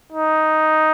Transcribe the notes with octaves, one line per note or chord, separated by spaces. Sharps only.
D#4